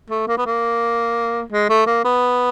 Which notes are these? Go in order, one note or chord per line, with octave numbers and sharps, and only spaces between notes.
A3
A#3
B3
A#3
G#3
A3
A#3
B3